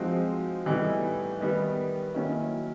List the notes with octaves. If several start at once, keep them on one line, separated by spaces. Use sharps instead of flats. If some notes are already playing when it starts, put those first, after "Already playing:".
Already playing: F3 G#3 C4 D#4 F#4
A2 E3 G3 B3 D#4
D#3 G3 B3
D#3 F#3 A#3 C#4 E4